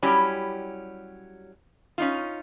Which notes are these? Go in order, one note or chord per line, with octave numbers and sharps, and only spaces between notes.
F#3 G3 C#4 E4 G4
C#4 D#4 F4